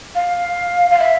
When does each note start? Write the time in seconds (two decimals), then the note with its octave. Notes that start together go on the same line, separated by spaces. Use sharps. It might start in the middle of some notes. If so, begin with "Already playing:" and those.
0.15 F5
0.91 F5
1.00 E5